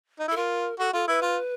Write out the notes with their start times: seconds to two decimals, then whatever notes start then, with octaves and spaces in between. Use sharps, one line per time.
0.19 D#4
0.28 E4
0.31 A4
0.36 F4 A#4
0.79 F#4 A4
0.93 F4 A4
1.08 E4 B4
1.22 F4